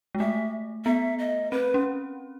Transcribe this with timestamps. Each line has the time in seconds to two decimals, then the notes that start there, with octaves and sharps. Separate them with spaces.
0.15 G#3
0.20 A3 E5
0.85 B3 E5
1.19 D#5
1.52 C4 B4
1.74 C#4